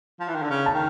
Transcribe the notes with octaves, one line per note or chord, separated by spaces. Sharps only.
F3
E3
D#3
D3
C#3
A5
D#3